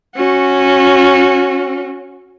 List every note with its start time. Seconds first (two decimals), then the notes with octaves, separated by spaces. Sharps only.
0.16 C#4 F#4